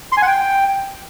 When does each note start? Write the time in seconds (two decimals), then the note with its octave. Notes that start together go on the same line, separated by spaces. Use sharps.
0.12 C6
0.17 G#5
0.22 F#5
0.27 G5